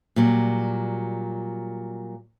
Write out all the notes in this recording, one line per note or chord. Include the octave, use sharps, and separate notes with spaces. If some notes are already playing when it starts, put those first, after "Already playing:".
A#2 F#3 G3